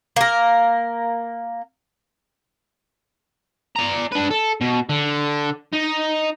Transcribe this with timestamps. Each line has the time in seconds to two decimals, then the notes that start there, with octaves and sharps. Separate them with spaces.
0.16 A#3 A#4
3.76 D5 A#5
4.12 D4 B4
4.31 A4
4.61 B2
4.90 D3
5.73 D#4